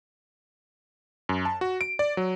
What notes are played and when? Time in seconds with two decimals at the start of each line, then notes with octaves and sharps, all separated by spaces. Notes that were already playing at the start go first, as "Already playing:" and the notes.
1.29 F#2
1.45 A5
1.61 F#4
1.81 D7
1.99 D5
2.17 F#3